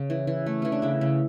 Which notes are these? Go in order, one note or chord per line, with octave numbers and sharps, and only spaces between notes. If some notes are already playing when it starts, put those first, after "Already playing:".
Already playing: C#3
E3
E3
A3
E3 C#4
D4
C#3 E4
C#3